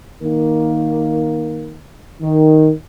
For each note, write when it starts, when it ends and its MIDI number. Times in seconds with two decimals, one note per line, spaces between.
0.22 1.80 51
0.22 1.80 58
2.21 2.70 51